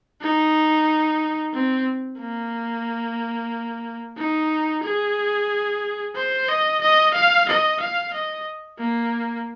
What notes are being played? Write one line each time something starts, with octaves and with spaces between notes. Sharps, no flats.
D#4
C4
A#3
D#4
G#4
C5
D#5
D#5
F5
D#5
F5
D#5
A#3